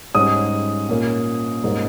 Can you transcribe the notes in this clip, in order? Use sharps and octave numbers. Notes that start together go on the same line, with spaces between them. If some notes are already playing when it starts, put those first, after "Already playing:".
G#2 G3 C#4 D#6
A#2 A#3 C#4
G#2 G3 A#3 C#4